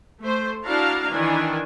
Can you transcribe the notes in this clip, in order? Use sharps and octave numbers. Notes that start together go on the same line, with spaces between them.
A3 C5
D4 E4 F#4 F5 A5 A#5
D#3 E3 D4 G#5